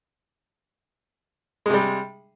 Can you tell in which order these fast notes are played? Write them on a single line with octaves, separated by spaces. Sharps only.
G#3 C3 G3